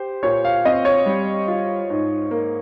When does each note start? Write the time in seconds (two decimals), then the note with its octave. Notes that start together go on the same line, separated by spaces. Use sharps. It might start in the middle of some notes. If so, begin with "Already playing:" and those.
Already playing: G4 C5
0.23 A#2 C#5
0.45 F5
0.65 C4 D#5
0.85 C#5
1.06 G3
1.48 F4
1.90 G#2
2.31 A#3